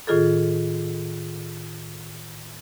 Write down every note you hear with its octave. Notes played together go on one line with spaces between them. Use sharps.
A2 D#3 F4 G#4 A4